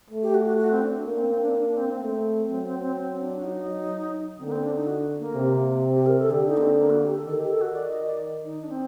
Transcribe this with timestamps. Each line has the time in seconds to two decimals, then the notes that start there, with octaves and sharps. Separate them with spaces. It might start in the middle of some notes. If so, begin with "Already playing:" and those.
0.10 A3
0.22 G4
0.34 F#4
0.45 F#4
0.58 F#4
0.71 C4
0.82 D4
1.05 A#3 D4
1.18 C4
1.29 C4
1.42 D4
1.53 D4
1.65 D4
1.77 C4
1.89 C4
2.00 A3 C4
2.48 F#3 C4
2.64 C4
2.81 C4
2.96 C4
3.20 D4
3.38 F#4
3.44 D#4
4.39 D3 C4
4.46 A#3
4.52 C4
4.63 D4
4.75 D#4
4.87 F#4
5.19 A#3
5.35 C3
5.95 G4
6.06 A#4
6.19 A4
6.30 D3 G4
6.47 D#4
6.57 A#3
6.62 C4
6.79 A#3
6.90 F#4
7.02 G4
7.14 A4
7.26 D#3 A4
7.38 G4
7.50 A4
7.61 F#4
7.74 D5
7.89 D#5
8.06 D5
8.45 D#4
8.63 D4
8.69 C4